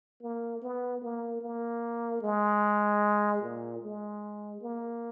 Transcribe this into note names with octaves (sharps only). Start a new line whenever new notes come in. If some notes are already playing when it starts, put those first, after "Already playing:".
A#3
B3
A#3
A#3
G#3
A#2
G#3
A#3